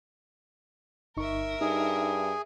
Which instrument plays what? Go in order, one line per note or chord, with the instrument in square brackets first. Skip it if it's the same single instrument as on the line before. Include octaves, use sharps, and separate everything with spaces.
[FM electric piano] G1 D#4 C#6 [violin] A#4 E5
[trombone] G2 [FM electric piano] D#4 [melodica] G#4